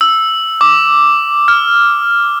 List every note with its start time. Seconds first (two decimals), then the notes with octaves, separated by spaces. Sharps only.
0.01 E6
0.61 D6
1.48 F6